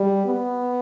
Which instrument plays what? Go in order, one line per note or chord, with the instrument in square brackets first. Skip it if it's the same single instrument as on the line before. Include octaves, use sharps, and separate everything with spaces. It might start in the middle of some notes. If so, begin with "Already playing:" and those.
Already playing: [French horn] G3
B3